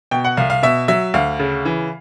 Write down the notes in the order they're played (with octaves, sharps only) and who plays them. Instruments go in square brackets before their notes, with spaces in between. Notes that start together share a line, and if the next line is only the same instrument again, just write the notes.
[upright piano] B2 G5
F#5
C2 F5
F5
B2 E5
F#3 E5
D2 F5
C#3
E3